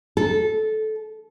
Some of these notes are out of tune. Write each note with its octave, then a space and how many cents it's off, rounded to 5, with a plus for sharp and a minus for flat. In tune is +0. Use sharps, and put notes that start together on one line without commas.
A4 -15